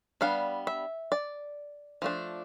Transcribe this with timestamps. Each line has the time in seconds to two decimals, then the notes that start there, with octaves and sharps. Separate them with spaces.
0.21 G3 B3 D4 F5
0.67 E5
1.12 D5
2.02 F3 A3 D4